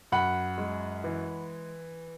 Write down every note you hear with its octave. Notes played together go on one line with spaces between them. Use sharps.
F#2 F#5 B5
G#3
E3